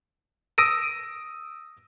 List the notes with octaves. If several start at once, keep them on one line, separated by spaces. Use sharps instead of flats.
D#6 E6 A#6 D7 D#7